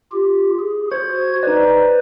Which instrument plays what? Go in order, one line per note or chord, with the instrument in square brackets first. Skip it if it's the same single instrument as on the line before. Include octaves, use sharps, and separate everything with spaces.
[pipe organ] F4 G4
G#4
[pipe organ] F#4 G#6 [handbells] C5
[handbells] D#4 D5 [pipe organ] B4 C5